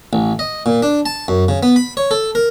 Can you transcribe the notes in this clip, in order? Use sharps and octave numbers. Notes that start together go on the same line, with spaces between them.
A1
D#5
A#2
D4
A5
F#2
C#3
B3
B5
C#5
A4
A#4